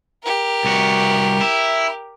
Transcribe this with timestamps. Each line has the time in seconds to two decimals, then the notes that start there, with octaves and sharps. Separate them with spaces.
0.23 G4 A#4
0.64 C2 F#4
1.41 E4